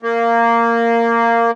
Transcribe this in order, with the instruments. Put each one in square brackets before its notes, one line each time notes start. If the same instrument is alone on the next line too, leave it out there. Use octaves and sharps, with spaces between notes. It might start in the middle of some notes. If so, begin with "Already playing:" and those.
[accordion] A#3